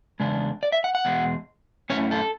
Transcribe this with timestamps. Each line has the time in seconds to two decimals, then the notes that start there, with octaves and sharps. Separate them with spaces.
0.20 E2 C#3 G#3 D4
0.63 D5
0.72 E5
0.84 F#5
0.95 F#5
1.05 E2 B2 G#3
1.90 F#2 D3 A3 C#4 E4 C#5
2.11 A4